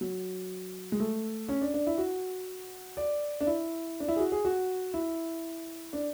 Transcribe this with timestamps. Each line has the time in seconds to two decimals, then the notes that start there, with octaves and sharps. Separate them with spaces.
0.01 F#3
0.92 G#3
1.00 A3
1.49 C#4
1.61 D4
1.74 D4
1.87 E4
1.98 F#4
2.97 D5
3.40 D4
3.47 E4
4.00 D4
4.08 E4
4.16 G#4
4.20 F#4
4.32 G#4
4.45 F#4
4.94 E4
5.93 D4